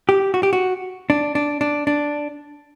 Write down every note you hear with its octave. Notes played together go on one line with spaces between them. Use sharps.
G4
F#4
G4
F#4
D4
D4
D4
D4